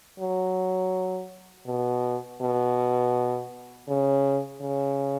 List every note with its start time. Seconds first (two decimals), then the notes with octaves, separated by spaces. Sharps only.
0.20 F#3
1.66 B2
2.41 B2
3.89 C#3
4.62 C#3